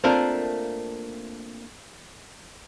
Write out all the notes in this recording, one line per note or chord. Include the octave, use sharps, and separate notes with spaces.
A3 A#3 C4 D4 F4 A#4